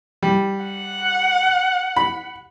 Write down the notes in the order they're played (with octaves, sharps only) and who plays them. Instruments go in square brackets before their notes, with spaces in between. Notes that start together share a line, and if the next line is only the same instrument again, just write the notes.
[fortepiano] G3
[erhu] F#5
[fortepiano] B5